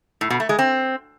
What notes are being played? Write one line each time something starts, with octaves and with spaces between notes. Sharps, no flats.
A2
B2
A3
G#3
C4